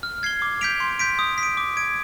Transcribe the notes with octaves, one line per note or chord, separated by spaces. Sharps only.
F6
G#6 C7 G7
D6
G6 B6 D7 F7
C6
G6 B6 D7
D#6
B6
D7
D6
G#6 D7